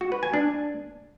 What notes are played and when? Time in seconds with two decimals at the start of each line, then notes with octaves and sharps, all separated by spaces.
0.01 F#4
0.12 B4
0.23 G#5
0.34 D4